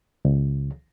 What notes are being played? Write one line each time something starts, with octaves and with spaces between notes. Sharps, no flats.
C#2